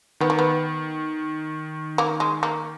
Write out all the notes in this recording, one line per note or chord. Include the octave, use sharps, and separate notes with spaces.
D#3 B3
A#3
B3
A#3
G#3
A#3